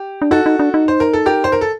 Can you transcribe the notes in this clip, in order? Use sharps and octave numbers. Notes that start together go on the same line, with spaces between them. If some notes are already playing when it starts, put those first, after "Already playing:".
Already playing: G4
D4
D#4 F#4 A4
D#4
D4
D#4
C5
A#4
A4
G4 A#4
C5
A#4
A4